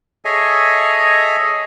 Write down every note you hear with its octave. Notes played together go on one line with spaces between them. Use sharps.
G#4 A4 C#5 D#5 E5 G#5